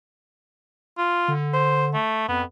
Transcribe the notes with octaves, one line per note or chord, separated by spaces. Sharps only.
F4
D3
C5
A3
F2 B3